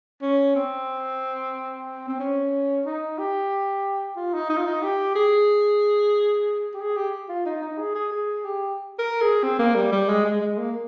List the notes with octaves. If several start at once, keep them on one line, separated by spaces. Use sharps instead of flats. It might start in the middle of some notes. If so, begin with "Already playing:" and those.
C#4
C4
C4
C#4
D#4
G4
F4
D#4
D#4
F4
D#4
G4
G#4
G4
G#4
G4
F4
D#4
D#4
G#4
G#4
G#4
G4
A#4
G#4
C4
A#3
G3
G3
G#3
G#3
G#3
A#3